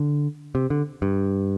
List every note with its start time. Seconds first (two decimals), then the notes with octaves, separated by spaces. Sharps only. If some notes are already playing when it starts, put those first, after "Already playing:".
Already playing: D3
0.55 C3
0.70 D3
1.02 G2